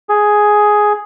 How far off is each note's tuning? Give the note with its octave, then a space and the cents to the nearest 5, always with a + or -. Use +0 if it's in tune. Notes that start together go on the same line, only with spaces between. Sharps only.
G#4 +5